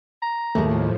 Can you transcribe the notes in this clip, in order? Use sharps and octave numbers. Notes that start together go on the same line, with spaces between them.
A#5
D#2 A2 F3 G#3 A3